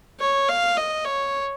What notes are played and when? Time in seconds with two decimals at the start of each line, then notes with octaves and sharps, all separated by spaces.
0.20 C#5
0.49 F5
0.77 D#5
1.05 C#5